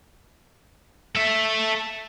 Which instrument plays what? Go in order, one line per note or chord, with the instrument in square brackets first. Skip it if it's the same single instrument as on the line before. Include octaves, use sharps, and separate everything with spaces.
[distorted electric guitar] A4 E5